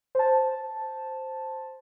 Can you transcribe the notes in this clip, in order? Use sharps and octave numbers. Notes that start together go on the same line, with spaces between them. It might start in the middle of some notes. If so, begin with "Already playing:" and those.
C5 A5